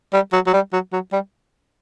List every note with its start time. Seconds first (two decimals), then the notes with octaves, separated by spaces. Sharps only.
0.13 G3
0.33 F#3
0.47 F#3
0.54 G3
0.73 F#3
0.93 F#3
1.13 G3